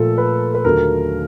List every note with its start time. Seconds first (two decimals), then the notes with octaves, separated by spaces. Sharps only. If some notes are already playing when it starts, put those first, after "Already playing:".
Already playing: A#2 F3 A3 A4
0.18 B4
0.55 B4
0.64 D#2 D3 F#3 A3 A#4